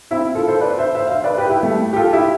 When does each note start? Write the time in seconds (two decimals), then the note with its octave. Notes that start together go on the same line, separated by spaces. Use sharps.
0.11 C4 E4
0.35 F4 A4
0.48 A4 C5
0.61 B4 D5
0.78 C5 E5
0.95 C5 E5
1.07 F5
1.11 C5 E5
1.24 B4 D5
1.38 G4 B4
1.49 E4 G4
1.63 A3
1.93 G4
1.96 F4 A4
2.13 E4 G4